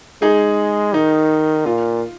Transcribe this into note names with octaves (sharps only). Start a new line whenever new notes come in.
G#3 D#4 G#4
D#3 D#4
A#2 F4